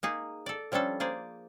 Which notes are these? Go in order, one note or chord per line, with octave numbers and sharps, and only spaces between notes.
A#3 D#4 G#4
A4 D5
F3 G3 C#4 D4 A4
A#3 G#4 C5 D5